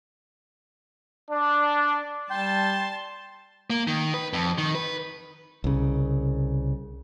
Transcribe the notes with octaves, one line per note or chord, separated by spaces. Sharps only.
D4
G3 G5 A5 C6
A#3
D#3
B4
F2
D#3
B4
C2 C#3